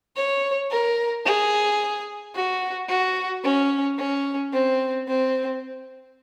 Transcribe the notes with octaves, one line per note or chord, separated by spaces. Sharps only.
C#5
A#4
G#4
F#4
F#4
C#4
C#4
C4
C4